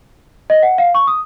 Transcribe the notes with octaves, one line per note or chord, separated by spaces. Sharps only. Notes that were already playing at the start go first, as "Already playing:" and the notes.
D#5
F#5
F5
C#6
D#6